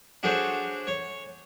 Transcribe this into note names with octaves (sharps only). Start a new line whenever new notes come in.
D4 F#4 G#4 A4 C5 C#5
C#5